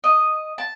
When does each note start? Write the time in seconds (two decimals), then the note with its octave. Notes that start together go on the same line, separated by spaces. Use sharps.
0.04 D#5
0.58 A5